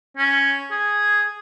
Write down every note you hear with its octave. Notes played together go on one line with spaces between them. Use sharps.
C#4
G#4